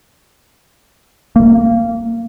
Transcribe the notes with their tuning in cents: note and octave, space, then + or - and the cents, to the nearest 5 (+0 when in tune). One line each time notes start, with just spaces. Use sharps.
A#3 -20